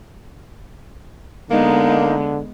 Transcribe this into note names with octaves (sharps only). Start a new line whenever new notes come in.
D3 G#3 A#3 B3 D#4